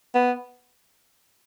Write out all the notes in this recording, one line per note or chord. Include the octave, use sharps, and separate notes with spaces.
B3